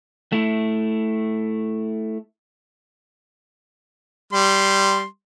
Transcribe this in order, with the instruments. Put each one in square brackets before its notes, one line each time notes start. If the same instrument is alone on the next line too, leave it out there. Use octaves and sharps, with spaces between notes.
[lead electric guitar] A3 E4
[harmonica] G3 C6